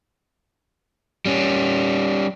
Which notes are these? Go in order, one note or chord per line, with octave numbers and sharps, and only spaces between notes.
G3 C#4